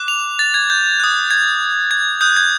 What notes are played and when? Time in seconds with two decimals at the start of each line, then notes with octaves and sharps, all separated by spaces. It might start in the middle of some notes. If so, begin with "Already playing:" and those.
Already playing: D6 F#6
0.08 F7
0.39 A6
0.54 G#6
0.70 G6
1.00 D#6 F#6
1.31 G#6
1.91 G#6
2.21 D#6 F#6 G6
2.36 G#6